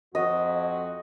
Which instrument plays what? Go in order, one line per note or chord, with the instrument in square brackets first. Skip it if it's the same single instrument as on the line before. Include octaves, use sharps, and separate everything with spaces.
[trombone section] F2 [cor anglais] F#4 [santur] D#5